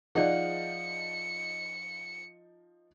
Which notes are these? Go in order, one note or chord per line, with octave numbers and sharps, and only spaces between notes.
F3 D#4 G#4 C5 D5 F5 F#5 C#7